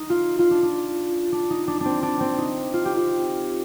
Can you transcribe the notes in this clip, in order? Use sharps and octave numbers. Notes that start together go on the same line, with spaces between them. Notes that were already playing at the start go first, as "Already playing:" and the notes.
Already playing: D#4
F4
F4
D4
D4
D4
D#4
D4
C4 D4
D4
C4
D#4
F4
G4
F4